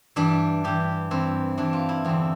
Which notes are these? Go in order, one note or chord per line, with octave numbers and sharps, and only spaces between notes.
G2 E3 D4
G2 E3 G4
G2 E3 C4
G2 E3 D4
F4
E4
E2 D3 C4